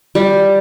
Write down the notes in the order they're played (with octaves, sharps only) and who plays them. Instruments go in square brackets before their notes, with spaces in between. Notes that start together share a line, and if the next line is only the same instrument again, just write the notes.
[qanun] G3